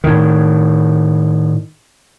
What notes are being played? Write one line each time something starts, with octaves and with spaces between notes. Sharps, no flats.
A2 D#3